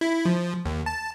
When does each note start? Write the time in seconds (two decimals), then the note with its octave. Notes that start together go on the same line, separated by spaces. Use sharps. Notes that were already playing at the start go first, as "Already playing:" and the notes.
0.01 E4
0.25 F3
0.65 D#2
0.86 A5